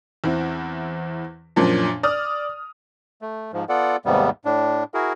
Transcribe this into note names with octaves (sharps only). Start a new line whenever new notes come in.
E2 C4 E4
F#2 A#2 F3 C#4 D4
D5 D#6 F6
A3
G#2 F3
B3 F4 A4 D5 F#5
D#2 G#2 C3 G3 B3
A2 D4
E4 F#4 G#4 A#4